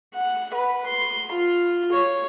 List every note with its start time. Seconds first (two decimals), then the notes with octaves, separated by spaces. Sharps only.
0.15 F#5
0.54 B4
0.87 C6
1.32 F4
1.92 C#5